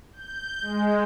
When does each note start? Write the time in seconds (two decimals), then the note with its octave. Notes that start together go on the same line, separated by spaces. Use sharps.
0.13 G6
0.61 G#3